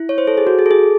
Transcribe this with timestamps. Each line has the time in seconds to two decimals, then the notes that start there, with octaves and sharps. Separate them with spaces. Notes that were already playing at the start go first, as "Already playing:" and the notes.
Already playing: E4
0.09 C#5
0.18 C5
0.27 A4
0.37 G#4
0.47 F#4
0.59 G#4
0.66 A4
0.71 G#4